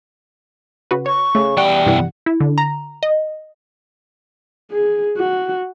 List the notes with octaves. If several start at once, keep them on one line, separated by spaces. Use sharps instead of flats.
C#3 F#4 B4
C#5 C#6
C#3 A3
E2 G3 F#5 G5 C#6
G2 C3 E3 F#5
E4
D3
A#5
D#5
G#4
F#4